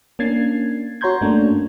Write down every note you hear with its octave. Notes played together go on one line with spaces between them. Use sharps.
A#3 C#4 D4 G#6 A6 C7
F#4 C#5 A#5 C6 G6 G#6
G2 A3 A#3 C#4 D4